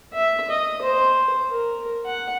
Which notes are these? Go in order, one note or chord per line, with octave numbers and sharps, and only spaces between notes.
E5
D#5
C5
A#4
F#5